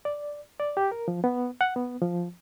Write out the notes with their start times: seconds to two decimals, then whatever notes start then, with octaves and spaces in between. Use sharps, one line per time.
0.05 D5
0.60 D5
0.77 G4
0.92 A#4
1.08 F3
1.24 B3
1.61 F#5
1.76 B3
2.02 F3